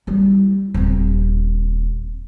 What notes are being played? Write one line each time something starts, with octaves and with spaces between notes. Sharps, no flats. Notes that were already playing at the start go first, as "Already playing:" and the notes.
G3 E4
D#1 C4